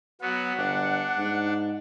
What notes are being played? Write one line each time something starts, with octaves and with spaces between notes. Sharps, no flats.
F#3 B3 F#5
G1 D4
G#2